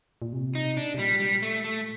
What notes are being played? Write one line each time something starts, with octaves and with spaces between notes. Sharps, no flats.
A#2
C3
D#4
D4
C3
A#2 G3
G3
A3
A3